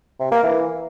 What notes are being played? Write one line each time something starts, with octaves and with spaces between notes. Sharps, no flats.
C3
A#3
E3